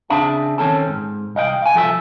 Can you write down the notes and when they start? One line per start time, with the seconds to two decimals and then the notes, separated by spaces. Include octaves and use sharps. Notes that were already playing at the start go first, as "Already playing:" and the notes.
0.10 C#3 C4 D4 G#4 E5 A5
0.58 D#3 C4 C#4 A4 A5
0.88 G#2
1.35 C2 D#5 F5 G5
1.62 F5 G#5
1.74 C2 F3 A4 B4 E5